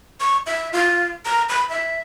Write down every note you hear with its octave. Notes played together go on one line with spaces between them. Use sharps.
C#6
E5
F4
A#5
B5
E5